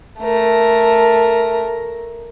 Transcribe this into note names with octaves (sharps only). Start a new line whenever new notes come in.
A3 A#4